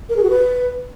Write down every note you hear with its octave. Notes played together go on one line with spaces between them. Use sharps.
A#4
G#4
F#4
B4